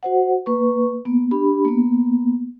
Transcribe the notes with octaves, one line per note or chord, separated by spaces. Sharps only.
F#4 C5 F#5
A#3 B4 C#6
A#3 B3
D4 G4 B5
A#3 B3